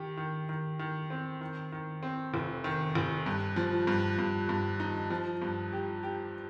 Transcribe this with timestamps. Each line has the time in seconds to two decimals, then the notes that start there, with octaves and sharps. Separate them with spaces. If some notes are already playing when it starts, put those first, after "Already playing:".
Already playing: D#3 G4
0.17 D#3
0.49 D#3
0.79 D#3
1.10 C4
1.41 D#3
1.72 D#3
2.03 C4
2.34 F1
2.64 D#3
2.95 F1
3.26 G2
3.56 F3
3.87 G2
4.18 G2
4.49 G2
4.80 D#4
5.10 F3
5.42 G2
5.72 G4
6.03 G4